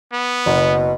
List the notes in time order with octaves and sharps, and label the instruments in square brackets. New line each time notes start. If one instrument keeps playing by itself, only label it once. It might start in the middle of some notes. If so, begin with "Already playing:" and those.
[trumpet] B3
[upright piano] F#1 [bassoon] B2